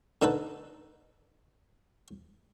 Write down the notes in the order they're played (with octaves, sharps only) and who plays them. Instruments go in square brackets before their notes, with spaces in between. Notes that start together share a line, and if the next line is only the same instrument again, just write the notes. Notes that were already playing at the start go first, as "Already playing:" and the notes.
[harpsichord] D3 D#4 A4 B4